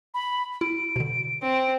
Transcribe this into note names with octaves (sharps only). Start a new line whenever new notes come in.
B5
E4 D7
B2 D3
C4